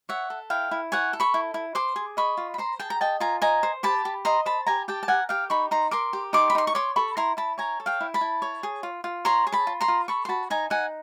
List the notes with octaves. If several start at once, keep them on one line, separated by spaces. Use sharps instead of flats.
C#5 E5 F#5
A4
E4 F5 G5
E4
C#5 F#5 G#5
A4
B5 C#6
E4
E4
C5 C6 D6
G#4
D#5 B5 C#6
F4
B5
C5 A#5 C6
G#4 G5 A5
A#5
D#5 G5 A5
F4 G#5 A#5
D#5 G#5 A#5
C5
G4 A5 B5
G4
D#5 A#5 C6
C5 A5 B5
G4 G#5 A#5
G4 G5 A5
A5
A#4 F#5 G#5
G4 F5 G5
D#4 B5 C#6
D#4 A#5 C6
A#4 C6 D6
G4
D#4 C6 D6
B5
D#4 C6
C#6
C#5 C6 D6
A4 B5 C#6
E4 A#5 C6
E4 A5 B5
C#5 G#5 A#5
A4
F5 G5
E4
A5 B5
E4
C#5
G#4
F4
F4
C#5 A#5 C6
G#4
A5 B5
F4
A#5 C6
F4
A4 B5 C#6
C6
F#4 A5 B5
D#4 G#5 A#5
D#4 F#5 G#5